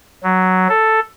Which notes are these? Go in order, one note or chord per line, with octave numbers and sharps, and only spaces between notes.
F#3
A4